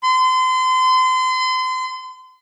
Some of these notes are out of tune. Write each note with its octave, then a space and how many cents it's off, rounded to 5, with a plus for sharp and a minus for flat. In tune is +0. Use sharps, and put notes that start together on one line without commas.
C6 -35